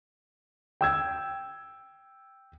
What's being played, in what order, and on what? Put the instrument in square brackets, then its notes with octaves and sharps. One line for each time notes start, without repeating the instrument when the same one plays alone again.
[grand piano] G5 E6 G#6